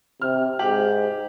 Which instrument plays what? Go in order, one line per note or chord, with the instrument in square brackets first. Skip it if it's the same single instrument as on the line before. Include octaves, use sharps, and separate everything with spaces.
[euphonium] C3 [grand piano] F6
[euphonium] G#2 [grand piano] G4 F#7